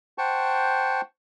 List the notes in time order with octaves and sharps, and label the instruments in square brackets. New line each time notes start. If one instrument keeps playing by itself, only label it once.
[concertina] C5 F#5 G5 A5 C#6